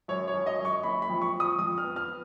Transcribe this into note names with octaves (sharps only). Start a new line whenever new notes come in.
F#2 C#5
C#5
F#2
D#5
F#2
C#6
F#1 B5
B5
F2
C#6
F3
D#6
F2 D#6
F6
B3
F6